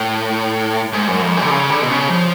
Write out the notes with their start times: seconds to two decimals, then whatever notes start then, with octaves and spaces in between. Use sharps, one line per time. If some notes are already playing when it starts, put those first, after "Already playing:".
Already playing: A2
0.93 G#2
1.07 F#2
1.21 F2
1.37 F#2
1.44 D3
1.50 C#3
1.70 D3
1.82 B2
1.90 C#3
2.10 F3